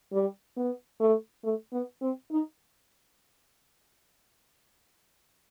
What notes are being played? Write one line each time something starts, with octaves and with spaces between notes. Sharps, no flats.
G3
B3
A3
A3
B3
C4
D#4